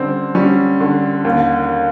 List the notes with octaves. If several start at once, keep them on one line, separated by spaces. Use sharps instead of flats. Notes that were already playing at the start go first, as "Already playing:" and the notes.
Already playing: D3 G3 C4 C#4
G3 C#4
D3
D#2